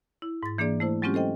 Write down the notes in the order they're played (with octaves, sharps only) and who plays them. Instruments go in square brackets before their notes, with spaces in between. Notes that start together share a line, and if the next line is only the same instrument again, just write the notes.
[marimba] E4
G#2 A6
E3 A#3 D4 G#4 D5
A3 E4 C5
F#3 G#3 C4 C#4 F4 G4
A4 C5 D#5 G5